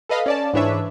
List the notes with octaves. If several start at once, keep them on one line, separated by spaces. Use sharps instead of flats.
A4 B4 D#5 F5 B5
C#4 D5 A5
G#2 E3 D4 B4 C#5 E5